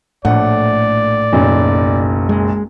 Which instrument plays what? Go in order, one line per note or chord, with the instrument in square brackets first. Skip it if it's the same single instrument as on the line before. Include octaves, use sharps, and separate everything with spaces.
[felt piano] A#1 F#5 [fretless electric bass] A2 A3 [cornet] D5
[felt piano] F#1 B1
[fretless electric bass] G#3